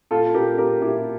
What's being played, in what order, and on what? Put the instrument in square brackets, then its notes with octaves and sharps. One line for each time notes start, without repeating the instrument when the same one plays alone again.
[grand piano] A#2 F4 A4
A#2 G4 A#4
A#2 G4 A#4
A#2 E4 G4